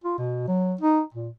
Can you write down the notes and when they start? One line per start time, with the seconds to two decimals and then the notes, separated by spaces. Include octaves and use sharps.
0.04 F4
0.18 B2
0.48 F#3
0.81 D#4
1.14 A#2